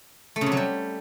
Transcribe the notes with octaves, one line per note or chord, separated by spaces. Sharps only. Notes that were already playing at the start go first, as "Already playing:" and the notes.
A3
C#3
C3
F#3
G3